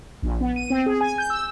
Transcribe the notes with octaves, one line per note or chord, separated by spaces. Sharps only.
A#1
B3
D#7
C4
G#4
G#5
G6
E6